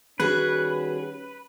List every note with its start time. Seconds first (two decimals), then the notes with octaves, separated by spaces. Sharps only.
0.20 D#3 G3 C#4 F#4 G#4 B4